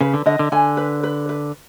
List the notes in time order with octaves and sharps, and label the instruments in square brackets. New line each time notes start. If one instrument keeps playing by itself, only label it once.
[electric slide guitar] C#3 [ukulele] B4
[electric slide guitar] D3
[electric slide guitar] D3 [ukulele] D#5
[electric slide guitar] D3
[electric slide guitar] D3 [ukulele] G#5
[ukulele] B4
B4
B4